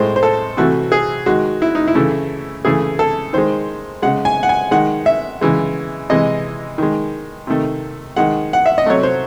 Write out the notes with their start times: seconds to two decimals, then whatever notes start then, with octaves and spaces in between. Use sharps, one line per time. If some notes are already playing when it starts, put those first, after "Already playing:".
Already playing: A2 G#3 C5
0.16 C5
0.23 A4
0.57 C3 E3 A3 F#4
0.92 G#4
1.26 D#3 G#3 F#4
1.62 E4
1.75 D#4
1.88 E4
1.95 C#3 E3 A3
2.65 C#3 E3 A3 G#4
2.99 A4
3.33 D#3 G#3 C5
4.02 C#3 G#3 F#5
4.25 G#5
4.43 F#5
4.49 G#5
4.71 D#3 G#3 F#5
5.06 E5
5.41 C#3 E3 G#3
6.10 C3 E3 G#3 D#5
6.78 D#3 G#3
7.47 C3 D#3 A3
8.16 D#3 G#3 F#5
8.53 F#5
8.66 E5
8.78 D#5
8.86 C3 F#3 A3 C#5
9.03 C5